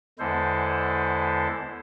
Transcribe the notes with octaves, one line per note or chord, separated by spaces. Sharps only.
E2 D3 G#3 E4 A4 C5